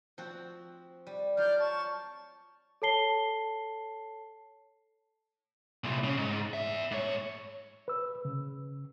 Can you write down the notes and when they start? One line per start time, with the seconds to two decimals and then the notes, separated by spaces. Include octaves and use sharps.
0.18 F3 C4 F#4
1.07 G3
1.37 F#3 F4 D5 F6 G6
1.59 A5 C#6
2.82 A4 C#5 A5 C7 G7
5.84 C2 A#2
6.04 C#3
6.17 G#2
6.53 B3 E5
6.91 G#2 C#5
7.88 B4 E6
8.25 C#3